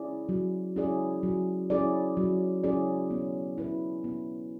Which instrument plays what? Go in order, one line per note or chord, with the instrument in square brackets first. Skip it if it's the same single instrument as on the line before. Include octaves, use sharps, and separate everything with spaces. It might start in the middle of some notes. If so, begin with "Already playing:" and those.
Already playing: [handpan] C#4 E4 G#4 D5
F#3
C#4 E4 G#4 D5
F#3
C#4 E4 G#4 D5
F#3
C#4 E4 G#4 D5
B3
E4 B4
B3